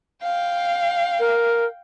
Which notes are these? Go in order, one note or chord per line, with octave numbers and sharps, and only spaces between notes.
F5 G5
A#4